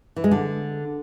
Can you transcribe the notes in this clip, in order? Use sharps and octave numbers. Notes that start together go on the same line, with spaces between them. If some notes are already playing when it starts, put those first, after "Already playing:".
E3
G#3
D3